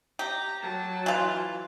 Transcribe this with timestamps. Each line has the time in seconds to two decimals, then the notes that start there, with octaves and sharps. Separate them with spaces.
0.19 G4 A#5
0.62 F#3 A5
1.06 E3 F4